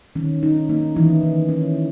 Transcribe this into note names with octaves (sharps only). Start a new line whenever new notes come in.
D#3 C#4
C#4 D#4
A#3 D#4
D#3 E3 E4
D#3
C#4